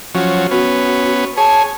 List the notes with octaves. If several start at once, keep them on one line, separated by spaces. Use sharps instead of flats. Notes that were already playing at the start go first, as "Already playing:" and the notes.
F3 F#3 C#4
B3 C#4 F#4
G#4 C#5 A5